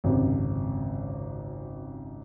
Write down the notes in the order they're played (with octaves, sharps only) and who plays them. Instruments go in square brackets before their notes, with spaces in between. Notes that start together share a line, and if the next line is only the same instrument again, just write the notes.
[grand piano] G#1 C#2 F#2 C3